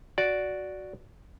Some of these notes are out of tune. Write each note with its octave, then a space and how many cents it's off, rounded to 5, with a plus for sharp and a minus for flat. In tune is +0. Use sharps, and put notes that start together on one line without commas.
F#4 +0 D5 -5